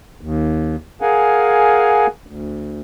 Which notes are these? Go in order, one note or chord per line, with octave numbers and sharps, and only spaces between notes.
D#2
G#4 A#4 F5 F#5 G#5
D2